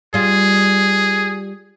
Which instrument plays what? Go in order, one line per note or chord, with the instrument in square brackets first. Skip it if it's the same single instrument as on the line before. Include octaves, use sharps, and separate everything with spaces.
[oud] G3 F4 [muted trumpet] G#4